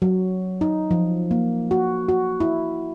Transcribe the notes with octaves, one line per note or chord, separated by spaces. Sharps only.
F#3
D#4
F3
A#3
F#4
F#4
E4